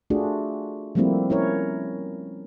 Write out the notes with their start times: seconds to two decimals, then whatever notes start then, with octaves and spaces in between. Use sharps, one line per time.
0.10 A3 D4 F4 F#4 G#4
0.95 F3 G3 A3 A#3 C4 E4
1.30 C#4 E4 A#4 C#5